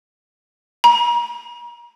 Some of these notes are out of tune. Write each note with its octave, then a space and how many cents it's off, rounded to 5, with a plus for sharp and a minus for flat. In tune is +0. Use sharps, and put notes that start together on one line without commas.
A#5 +40